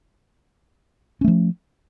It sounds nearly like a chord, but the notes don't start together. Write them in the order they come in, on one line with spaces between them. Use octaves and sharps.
C#4 A3 F3